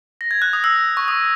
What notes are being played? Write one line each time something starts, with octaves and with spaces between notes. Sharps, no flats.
A#6
G#6
F#6
D#6
E6
C#6
D#6